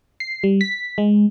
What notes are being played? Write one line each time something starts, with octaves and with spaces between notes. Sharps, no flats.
C7
G3
B6
G#3